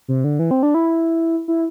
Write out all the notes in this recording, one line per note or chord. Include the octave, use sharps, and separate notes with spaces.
C3
D3
E3
C4
D4
E4
E4